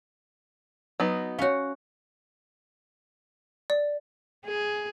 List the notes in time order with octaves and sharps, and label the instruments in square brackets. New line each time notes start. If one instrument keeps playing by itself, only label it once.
[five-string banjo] F#3 B3 D#4
[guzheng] C#4 F#4 [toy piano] C#5 F5
[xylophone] D5
[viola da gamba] G#4